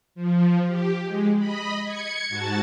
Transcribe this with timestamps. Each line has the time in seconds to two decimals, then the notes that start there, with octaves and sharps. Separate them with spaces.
0.15 F3
0.67 G4
1.04 G#3
1.38 D#5 B5
1.84 G#6 C#7
2.29 G#2 F#4 A5 A6